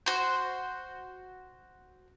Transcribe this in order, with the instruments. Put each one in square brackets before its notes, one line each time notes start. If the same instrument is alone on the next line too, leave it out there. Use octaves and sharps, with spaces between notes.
[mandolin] F#4 C5